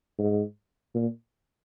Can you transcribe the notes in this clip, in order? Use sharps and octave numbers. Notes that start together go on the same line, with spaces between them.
G#2
A#2